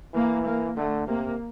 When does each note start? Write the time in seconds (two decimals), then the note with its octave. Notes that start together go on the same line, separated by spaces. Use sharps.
0.14 E3 A#3
0.45 A#3
0.76 D3 A3
1.07 C3 A#3